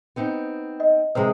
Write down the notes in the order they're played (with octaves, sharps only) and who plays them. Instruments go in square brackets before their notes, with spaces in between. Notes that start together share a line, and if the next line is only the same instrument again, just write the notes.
[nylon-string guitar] B3 C4 D#4
[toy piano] D#5
[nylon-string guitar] C3 D#3 G#3 [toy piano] B4 C5 A#5